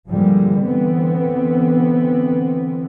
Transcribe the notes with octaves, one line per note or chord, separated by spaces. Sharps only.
G2 D3 F3 G3 G#3 A#3
D3 E3 B3 C4